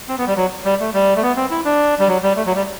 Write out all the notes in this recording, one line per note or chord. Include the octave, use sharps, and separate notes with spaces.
C4
B3
G3
F#3
G3
A3
G3
A3
B3
C4
E4
D4
G3
F#3
G3
A3
F#3
G3